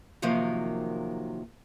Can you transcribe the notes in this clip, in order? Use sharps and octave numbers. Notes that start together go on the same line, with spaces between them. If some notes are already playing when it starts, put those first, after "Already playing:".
C3 D#3 F3 F#3 A#3